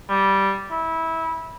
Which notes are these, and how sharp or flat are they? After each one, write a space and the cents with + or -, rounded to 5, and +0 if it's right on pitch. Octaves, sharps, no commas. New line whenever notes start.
G3 -10
E4 -20